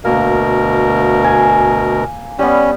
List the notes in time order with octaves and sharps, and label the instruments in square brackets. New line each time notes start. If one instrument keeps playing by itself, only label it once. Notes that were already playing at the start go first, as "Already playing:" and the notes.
[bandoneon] D2 B2 A#4 [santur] A#3
[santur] G#5
[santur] G3 B3 [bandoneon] C#4